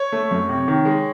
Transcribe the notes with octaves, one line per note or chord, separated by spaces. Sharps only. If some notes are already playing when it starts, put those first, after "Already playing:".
Already playing: C#5
A3
F#2
C3
D#3
G#3